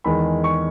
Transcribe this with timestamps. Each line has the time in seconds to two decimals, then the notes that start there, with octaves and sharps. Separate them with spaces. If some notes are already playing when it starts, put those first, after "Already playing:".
0.04 E2 D#3 G#3 B5
0.44 C#6